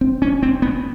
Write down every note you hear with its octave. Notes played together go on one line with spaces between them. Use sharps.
C4
C#4
C4
B3